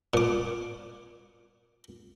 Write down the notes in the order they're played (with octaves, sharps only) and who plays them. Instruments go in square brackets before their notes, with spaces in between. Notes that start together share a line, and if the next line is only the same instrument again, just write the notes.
[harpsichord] A#2 D6